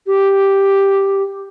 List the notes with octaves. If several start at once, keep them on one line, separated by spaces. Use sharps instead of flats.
G4